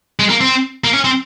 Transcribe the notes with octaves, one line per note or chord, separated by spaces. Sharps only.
G#3
A#3
C4
A#3
C#4
C4